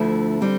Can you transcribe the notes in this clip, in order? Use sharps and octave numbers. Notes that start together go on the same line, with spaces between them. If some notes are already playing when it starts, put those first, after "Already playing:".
Already playing: D2 D3 F3 A3 E4
D3 G3 C4